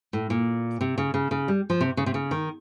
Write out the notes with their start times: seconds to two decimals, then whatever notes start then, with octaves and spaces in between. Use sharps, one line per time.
0.13 A2
0.30 A#2
0.81 C3
0.98 C#3
1.14 C#3
1.31 C#3
1.48 G3
1.70 F3
1.81 C3
1.97 C#3
2.06 C3
2.14 C#3
2.31 D#3